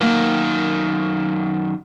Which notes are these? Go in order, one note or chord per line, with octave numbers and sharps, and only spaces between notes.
F#2 D#3 A#3